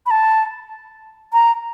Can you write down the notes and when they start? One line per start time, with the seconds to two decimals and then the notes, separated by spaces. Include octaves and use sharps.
0.06 B5
0.11 A5
1.33 A#5